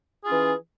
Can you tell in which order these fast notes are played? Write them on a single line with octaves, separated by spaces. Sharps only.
G#4 F4 C#4 E3